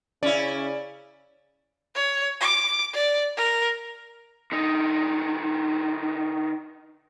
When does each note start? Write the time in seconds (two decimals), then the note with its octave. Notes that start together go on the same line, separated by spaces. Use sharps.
0.23 C#3 C#4 E4 D5
1.95 C#5
2.41 D6
2.93 D5
3.37 A#4
4.52 D3 D#4